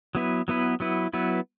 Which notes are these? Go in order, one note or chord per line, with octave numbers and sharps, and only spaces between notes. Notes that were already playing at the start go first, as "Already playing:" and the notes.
F#3 B3 E4 B4
F#3 B3 E4 B4
F#3 B3 E4 B4
F#3 B3 E4 B4